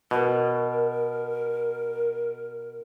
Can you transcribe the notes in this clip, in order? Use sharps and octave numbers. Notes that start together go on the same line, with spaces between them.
B2 A#4